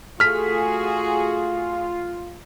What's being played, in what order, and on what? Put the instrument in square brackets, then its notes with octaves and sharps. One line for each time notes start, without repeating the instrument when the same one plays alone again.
[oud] A3 [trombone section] F4 [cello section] F#4 G#4 [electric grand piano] F6 B6